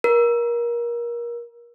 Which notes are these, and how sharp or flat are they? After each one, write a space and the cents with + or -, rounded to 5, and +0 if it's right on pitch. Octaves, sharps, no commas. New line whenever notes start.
A#4 +25